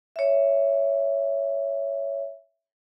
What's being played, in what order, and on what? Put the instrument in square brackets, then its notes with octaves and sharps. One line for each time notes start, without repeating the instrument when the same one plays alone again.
[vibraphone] C#5 E5